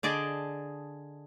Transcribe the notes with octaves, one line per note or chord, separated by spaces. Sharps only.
D3 G#4 D5 D#5 A5